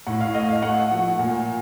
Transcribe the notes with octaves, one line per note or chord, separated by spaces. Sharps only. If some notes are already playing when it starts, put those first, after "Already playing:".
A2 F#5
F5
A3 D#5
F5
A3 F#5
F3
A#2